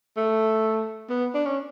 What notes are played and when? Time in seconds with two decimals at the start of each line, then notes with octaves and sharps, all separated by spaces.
0.17 A3
1.10 B3
1.34 D4
1.46 C#4